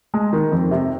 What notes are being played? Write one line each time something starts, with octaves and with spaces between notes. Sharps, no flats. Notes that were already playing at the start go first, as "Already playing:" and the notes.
G#3
D#3
F2
C3